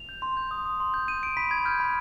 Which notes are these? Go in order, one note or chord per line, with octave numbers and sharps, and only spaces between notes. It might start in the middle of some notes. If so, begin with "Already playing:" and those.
Already playing: F7
G6
C6
G6
D#6
D#6
C6
G6
G6 D#7
G6 D7
B5 B6
B5 G#6
F6 G6
B5